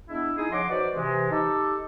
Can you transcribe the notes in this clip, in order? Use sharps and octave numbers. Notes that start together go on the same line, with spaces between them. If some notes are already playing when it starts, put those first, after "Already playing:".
G#3 B3 D4 E4
G#3 D#4 E4 G#4
C#3 F3 D#5 F#5 C6 D6
D#4 F#4 B4 C5 D5
C3 E3 G#3
D#4 G4 A4